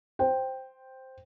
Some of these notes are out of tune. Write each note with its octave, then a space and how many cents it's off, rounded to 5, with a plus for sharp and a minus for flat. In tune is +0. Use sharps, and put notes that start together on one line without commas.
C5 +0 G5 +0